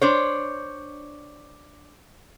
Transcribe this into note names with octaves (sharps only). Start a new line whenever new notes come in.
D4 C5 C#5